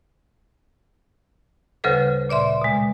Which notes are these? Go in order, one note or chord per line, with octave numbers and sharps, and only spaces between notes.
D2 C#3 G3 A4 B4 C5
A#2 D5 E5 C6
B2 G#3